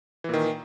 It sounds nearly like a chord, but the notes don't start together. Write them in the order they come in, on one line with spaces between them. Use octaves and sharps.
E3 A#2 D#3